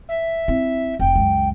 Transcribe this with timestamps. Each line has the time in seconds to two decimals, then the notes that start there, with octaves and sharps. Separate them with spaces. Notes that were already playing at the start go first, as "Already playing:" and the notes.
0.08 E5
0.48 C4 E4
0.99 F1 G5
1.16 C#2 F#2